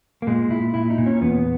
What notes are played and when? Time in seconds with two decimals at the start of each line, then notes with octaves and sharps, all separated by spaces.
0.22 A#3
0.27 A#2 G#3
0.50 A#2 E4
0.74 A#2 E4
0.90 D#4
0.98 A#2
1.06 C#4
1.21 E2 B3